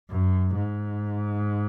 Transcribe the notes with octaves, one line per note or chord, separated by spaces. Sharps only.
F#2
G#2